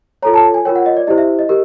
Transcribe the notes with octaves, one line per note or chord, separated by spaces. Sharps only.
F4 A4 C#5 A#5
A5
G#5
F4 A#4 C#5 G5
F#5
D#5
D5
E4 G4 C5 D#5
E5
D#5
G4 A#4